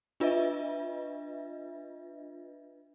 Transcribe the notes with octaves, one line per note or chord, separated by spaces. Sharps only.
D4 F4 B4 D#5 E5